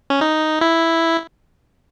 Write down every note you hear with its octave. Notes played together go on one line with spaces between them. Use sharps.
C#4
D#4
E4